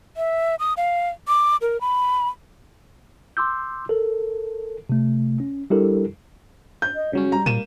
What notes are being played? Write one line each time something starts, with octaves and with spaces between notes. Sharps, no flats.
E5
D#6
F5
D6
A#4
B5
C6 D6 E6 G6
A4 A#4
C3 A3
C#4
G3 D4 E4 G4 A4 A#4
G6
D#5
C#3 F#3 G3 C#4
G3 A#5
A#2 A#3 D#7 E7